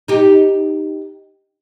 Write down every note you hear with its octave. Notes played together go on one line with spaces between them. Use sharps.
D#4 G4